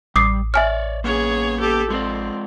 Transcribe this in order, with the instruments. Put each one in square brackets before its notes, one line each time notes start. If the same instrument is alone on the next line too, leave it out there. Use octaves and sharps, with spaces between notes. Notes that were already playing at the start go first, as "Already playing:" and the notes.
[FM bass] A1 [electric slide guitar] G3 [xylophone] D6 D#6 C7
[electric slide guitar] C#5 D5 [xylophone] E5 G#5 F6
[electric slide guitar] A#3 B3 C#4 [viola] G#4 C#5
[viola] G4 A4
[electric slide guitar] G#3 F4 D5 [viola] C4